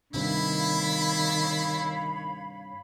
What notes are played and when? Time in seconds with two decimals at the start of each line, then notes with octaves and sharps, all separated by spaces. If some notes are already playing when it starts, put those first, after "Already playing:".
0.14 G2 C3 D#3 E4 C#5 F5 B5